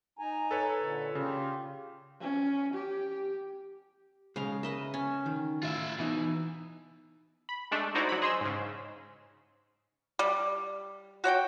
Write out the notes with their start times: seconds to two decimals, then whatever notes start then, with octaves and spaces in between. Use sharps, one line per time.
0.19 D#4 G#5 A#5
0.51 A4 B4 C#5
0.79 A#2 D3
1.15 C#3 F4 G4
2.20 C#4
2.73 G4
4.36 B1 C#3 G#3 F5 A#5
4.63 A#4 B4 D#5 E5
4.94 C#4
5.26 D#3
5.63 A2 F4 E5
5.98 B2 E3 D#4
7.49 B5
7.71 G#3 A3 D4
7.95 D#4 E4 F#4 C5 D5 A#5
8.09 F#3 B5
8.22 G#4 C5 D#5 C6 E6
8.41 G#2 C#3
10.19 G3
11.24 F#4 C#5 F#5 G5